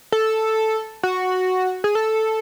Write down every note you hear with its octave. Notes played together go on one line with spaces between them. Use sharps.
A4
F#4
G#4
A4